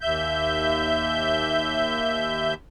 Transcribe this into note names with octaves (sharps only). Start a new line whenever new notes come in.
D#2 E5 G6